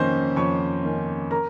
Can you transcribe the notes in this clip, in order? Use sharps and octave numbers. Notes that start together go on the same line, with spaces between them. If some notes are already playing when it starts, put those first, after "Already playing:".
Already playing: F2 D#3 A#3 C#4 C5 C6
F2 C#5 C#6
D#3 A#3 C#4
A#4 A#5